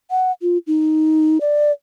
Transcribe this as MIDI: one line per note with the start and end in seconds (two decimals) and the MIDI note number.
0.11 0.32 78
0.42 0.58 65
0.67 1.38 63
1.41 1.72 74